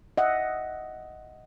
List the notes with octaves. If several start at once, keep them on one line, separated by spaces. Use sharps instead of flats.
D#5 E5 F#5